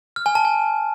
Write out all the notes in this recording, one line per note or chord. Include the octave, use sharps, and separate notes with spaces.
F6
G#5
A5
G#5